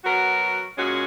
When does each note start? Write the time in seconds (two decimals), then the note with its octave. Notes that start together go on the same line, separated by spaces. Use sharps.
0.03 F#3 B3 F#4 A#4
0.77 A#2 G#3 C#4 F#4